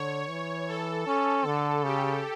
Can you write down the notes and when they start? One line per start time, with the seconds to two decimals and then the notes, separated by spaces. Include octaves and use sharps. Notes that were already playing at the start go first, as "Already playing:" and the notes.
Already playing: D3 C#5
0.30 E3
0.68 A4
1.07 C#4 A4
1.45 D3 A4
1.83 C#3 G4